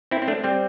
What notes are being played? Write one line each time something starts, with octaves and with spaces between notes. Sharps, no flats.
C4 E4
C4
A3 D4
G3 C4